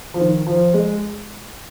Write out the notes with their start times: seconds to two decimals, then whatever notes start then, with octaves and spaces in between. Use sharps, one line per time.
0.14 F3
0.20 D#3
0.47 F3
0.74 G#3